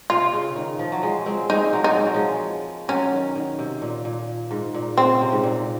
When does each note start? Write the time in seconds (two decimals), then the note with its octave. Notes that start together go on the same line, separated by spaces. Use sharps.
0.10 C3 F4
0.33 C#3
0.56 D#3
0.79 F3
0.92 F#3
1.03 F3 G#3
1.25 G#3 C4
1.50 G#3 C4 D#4
1.73 F#3 A#3
1.84 D#4
1.96 G#3
2.05 F#3
2.15 F3 G#3
2.88 F#3 C#4
3.12 D#3
3.35 D#3
3.59 C3
3.82 A#2
4.05 A#2
4.51 G#2
4.74 A#2
4.97 C#3 C4
5.21 C3
5.32 G#2
5.43 A#2